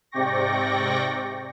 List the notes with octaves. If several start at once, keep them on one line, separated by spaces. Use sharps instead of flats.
G#2 C3 D5 G5 C#6 A#6